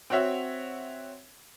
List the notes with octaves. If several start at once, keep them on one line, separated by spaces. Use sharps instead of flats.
C4 F#4 C#5 E5 F#5